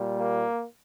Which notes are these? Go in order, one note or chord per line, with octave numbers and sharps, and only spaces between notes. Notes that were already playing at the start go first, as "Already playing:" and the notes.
Already playing: A#2 G3
A#3